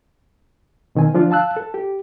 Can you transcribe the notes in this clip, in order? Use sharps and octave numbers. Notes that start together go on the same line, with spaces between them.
B2 D#3 C4 G#5
D3 F3 D4 F4
F5 A5 E6 F#6
A4
G4